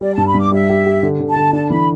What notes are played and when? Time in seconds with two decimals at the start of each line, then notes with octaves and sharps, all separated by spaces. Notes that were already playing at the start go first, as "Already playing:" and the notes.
0.01 G3 D5
0.14 G2 A5
0.27 B5
0.34 G2 D6
0.51 G3 E5
0.69 G4
0.86 G4
1.03 D3
1.20 D3
1.29 A5
1.36 D3
1.53 D4 A5
1.70 E3 B5